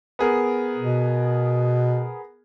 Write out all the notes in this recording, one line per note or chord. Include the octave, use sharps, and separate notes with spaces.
B3 G#4 A#4
B2